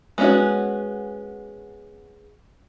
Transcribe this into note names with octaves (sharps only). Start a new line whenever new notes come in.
G#3 B3 C#4 F4 F#4